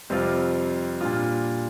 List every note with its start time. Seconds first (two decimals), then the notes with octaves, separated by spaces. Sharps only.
0.10 F2 C3 G3 C4 F4
1.01 A#2 G3 D4 F4